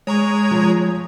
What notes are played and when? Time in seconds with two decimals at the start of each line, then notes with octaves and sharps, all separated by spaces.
0.07 G#3 C#5 A#5 C#6
0.51 F3